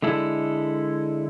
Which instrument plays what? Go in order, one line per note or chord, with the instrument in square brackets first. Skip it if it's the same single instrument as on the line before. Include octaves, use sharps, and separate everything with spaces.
[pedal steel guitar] D3 G#3 E4 A4